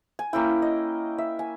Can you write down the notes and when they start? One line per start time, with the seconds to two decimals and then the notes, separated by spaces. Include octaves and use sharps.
0.19 G#5
0.33 A#3 C#4 E4 G5
0.62 D#5
1.18 E5
1.39 G#5